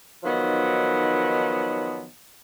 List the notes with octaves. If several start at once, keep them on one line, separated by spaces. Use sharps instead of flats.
D#3 F3 F#3 B3 D#4